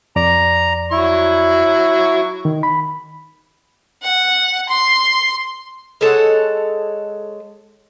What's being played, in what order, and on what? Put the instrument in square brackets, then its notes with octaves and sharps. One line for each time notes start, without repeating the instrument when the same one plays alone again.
[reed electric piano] F2 D5 [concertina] A#5
[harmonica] F#3 C#6 [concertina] E4
[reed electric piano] D#3
B5
[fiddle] F#5
C6
[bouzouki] G#3 A4 C#5 F#5